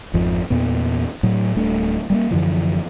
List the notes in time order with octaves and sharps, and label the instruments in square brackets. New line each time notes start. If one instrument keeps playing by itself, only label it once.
[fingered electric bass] G#1 F2 F3
E2 A#2 B3
A2 F#3
D1 G3 A3 D4
G3 A3 A#3
F#2 D3 E3 F3